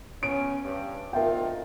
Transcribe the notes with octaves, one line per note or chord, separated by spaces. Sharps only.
B3 C#4 D7
G2
D2 D#4 F4 A#4 E5 G5